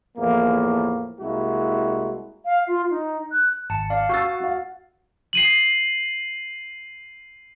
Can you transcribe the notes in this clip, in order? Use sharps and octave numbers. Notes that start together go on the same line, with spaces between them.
E2 A2 F3 A#3
C2 G#3 A#3 E4 F#4
F5
F4
D#4
F#6
G#1 A5 C#7
D5 F5
F#4 F#5 C#6 E6 A6
F#4 F5
C7 D#7 F#7